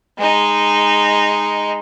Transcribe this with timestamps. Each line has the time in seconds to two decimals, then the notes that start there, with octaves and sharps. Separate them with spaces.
0.18 G#3 D#4